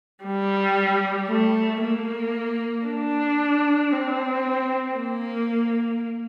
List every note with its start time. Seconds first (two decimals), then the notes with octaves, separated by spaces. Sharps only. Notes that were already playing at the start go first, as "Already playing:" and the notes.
0.24 G3
1.29 A3
1.82 A#3
2.87 D4
3.92 C4
4.97 A#3